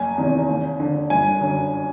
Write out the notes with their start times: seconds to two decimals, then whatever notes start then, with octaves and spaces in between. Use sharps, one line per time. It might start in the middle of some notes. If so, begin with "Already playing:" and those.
Already playing: F#1 G#5
0.18 E2 C3 D#3
0.48 D#2
0.80 D3
1.10 G1 G#5
1.41 F#2 D3